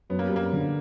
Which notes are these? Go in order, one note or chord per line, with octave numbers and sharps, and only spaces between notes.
F#2 B3
A#3
G3
F#2 A#3
D3